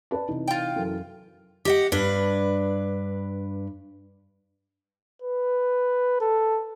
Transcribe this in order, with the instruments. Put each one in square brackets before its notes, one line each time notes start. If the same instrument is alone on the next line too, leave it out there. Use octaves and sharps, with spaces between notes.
[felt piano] B4 D5 A5
C3 E3 D#4
[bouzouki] F4 G5
[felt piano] F#2 E3 A4
[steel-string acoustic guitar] G4 D#5 F#5
G2 D4 B4
[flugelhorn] B4
A4